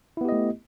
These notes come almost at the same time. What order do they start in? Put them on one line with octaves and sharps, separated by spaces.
E4 B3 G4 D#5 A3